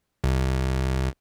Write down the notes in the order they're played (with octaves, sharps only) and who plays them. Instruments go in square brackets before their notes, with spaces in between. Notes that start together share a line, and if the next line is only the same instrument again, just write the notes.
[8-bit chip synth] C2